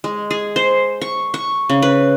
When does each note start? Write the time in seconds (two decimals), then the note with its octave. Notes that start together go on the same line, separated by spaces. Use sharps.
0.04 G#3
0.31 G#4
0.56 C5
1.01 C#6
1.34 C#6
1.69 C#3
1.82 B4